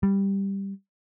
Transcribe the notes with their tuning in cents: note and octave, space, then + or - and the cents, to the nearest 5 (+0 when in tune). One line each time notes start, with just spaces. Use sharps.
G3 +5